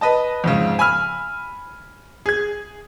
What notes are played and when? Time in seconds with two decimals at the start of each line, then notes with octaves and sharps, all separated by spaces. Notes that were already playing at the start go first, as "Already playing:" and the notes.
0.01 B4 D#5 A5
0.44 F2 G#2 C#3
0.79 G#5 B5 E6 F6
2.26 G#4 G#6